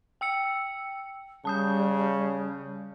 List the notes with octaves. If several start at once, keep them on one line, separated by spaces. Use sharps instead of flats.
G5 E6 C#7
C#3 G3 A5 D#6 G6